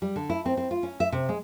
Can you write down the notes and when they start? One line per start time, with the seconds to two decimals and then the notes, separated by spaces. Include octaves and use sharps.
0.02 G3
0.16 D3
0.30 E4
0.46 C4
0.57 C4
0.71 F4
0.83 C#4
1.00 E5
1.12 C3
1.29 G#3